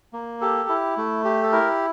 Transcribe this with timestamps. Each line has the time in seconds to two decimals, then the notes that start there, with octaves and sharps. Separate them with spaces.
0.13 A#3
0.41 G4 A4
0.69 E4
0.97 A3
1.25 G4
1.43 A4
1.52 E4 A#4